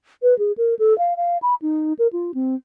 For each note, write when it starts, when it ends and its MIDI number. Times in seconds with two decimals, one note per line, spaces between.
0.23 0.37 71
0.39 0.52 68
0.58 0.75 70
0.79 0.96 69
0.98 1.14 77
1.17 1.38 77
1.42 1.55 83
1.62 1.93 63
1.99 2.07 70
2.13 2.32 65
2.34 2.55 60